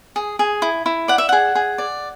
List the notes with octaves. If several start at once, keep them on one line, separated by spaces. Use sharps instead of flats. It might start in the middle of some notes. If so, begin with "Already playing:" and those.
G#4
G#4
E4
E4
D5 F#5
E5
G#4 F#5
G#4
D5